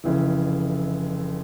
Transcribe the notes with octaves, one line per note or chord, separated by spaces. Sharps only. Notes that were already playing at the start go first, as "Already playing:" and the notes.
F1 F2 C#3 E3